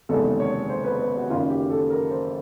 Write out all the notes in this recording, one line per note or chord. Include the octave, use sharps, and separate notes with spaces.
F#1 E2 C3 D#3 G#3 A4
C#5
C5
B4
B4
F#4
F#1 F#2 D#3 F4
G4
A4
A#4
C5